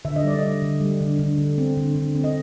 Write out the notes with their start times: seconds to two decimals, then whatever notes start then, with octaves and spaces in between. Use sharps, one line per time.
0.05 D3 E5
0.16 D#5
0.24 G3 D5
0.39 G3 D#5
0.62 D3
0.81 G3
1.01 D3
1.19 D3
1.38 D3
1.58 C4
1.77 D3
1.96 D3
2.15 C4
2.24 D#5